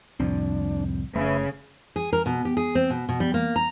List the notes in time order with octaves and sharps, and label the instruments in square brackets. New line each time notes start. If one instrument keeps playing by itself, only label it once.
[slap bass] C2 A2 [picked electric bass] F2 F3 C4 [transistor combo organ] D4
[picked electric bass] F#1 [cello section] C#3 [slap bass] A3 [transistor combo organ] B4 E5
[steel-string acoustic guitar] G#4
A#4
B2
G4
G#4
C4
B2
B2
G3
A#3
A#5